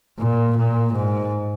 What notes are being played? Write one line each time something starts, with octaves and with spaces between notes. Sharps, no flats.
A#2
A#2
G#2